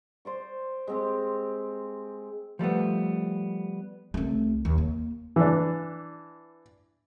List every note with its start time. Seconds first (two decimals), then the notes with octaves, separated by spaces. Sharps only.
0.25 C5 D5 C#6
0.87 G#3 C4 G4
2.59 F3 G3 A3 B3
4.14 C2 A3
4.65 D#2
4.78 A#3
5.36 E3 D4